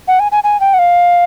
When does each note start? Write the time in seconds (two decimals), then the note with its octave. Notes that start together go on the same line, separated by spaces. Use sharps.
0.08 F#5
0.20 G#5
0.32 G#5
0.44 G#5
0.60 G5
0.74 F#5
0.79 F5